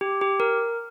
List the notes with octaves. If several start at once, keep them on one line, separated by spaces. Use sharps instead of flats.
G4
G4
A#4